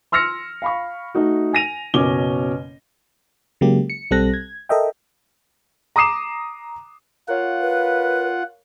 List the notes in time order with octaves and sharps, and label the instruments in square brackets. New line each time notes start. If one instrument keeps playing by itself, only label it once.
[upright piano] C6 E6 F6 A#6 C#7
F5 B5 C#6
A3 D#4 F#4
G#5 A#6 D#7 F7
F#1 B2 C#4 C#5 D6 G7
[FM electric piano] C#3 F#3 G#3 A#3 G4
C#7
B1 G3 C4 A4 F#6 A#6
G#6
A4 A#4 D#5 E5 G5
[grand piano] A#5 D6 D#6 C7 E7
[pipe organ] F4 F#5 [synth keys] A#4 C#5 F5
[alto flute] B4